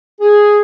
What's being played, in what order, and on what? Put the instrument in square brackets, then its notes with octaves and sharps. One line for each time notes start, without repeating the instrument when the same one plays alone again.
[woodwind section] G#4